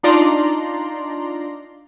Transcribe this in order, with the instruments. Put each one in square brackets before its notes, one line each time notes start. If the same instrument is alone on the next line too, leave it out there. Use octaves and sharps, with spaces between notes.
[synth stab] D4 D#4 F4 D5 A#5 C6